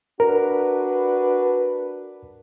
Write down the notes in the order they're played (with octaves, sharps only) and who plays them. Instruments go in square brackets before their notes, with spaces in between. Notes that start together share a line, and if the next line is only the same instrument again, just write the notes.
[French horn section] D4 F#4 B4 [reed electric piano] A#4